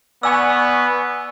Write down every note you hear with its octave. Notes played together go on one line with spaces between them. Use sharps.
B3 D5 G#5 C#6 E6